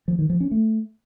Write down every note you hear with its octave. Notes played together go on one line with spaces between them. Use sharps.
F3
D#3
F3
C#4
A3